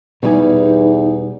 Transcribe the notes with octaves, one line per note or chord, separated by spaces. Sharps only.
E2 B2 G3 D#4 G#4